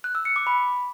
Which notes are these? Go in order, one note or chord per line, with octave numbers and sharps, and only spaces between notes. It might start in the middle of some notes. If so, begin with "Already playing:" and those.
F#6
E6
C#7
D6
B5